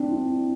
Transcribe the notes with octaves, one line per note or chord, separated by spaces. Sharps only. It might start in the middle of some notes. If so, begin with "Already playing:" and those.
Already playing: C4 D4
E4